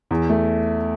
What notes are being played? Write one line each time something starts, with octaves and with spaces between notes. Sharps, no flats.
E2
A3